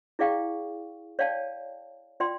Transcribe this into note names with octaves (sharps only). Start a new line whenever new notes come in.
E4 G#4 D5 F5 G5 C#6
C#5 D5 F5 G5 A5
F4 D5 G5 C6